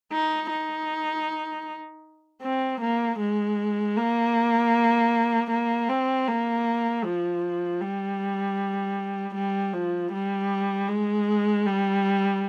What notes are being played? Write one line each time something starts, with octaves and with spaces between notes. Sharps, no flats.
D#4
D#4
C4
A#3
G#3
A#3
A#3
C4
A#3
F3
G3
G3
F3
G3
G#3
G3